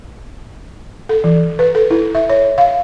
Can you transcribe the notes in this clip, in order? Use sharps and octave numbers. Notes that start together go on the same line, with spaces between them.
A4
E3
B4
A4
E4
E5
C#5
F5